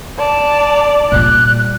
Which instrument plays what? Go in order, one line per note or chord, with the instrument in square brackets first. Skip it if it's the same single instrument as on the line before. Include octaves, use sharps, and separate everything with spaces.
[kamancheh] D5 [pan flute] A5
[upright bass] A#2 G3 [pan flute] F#6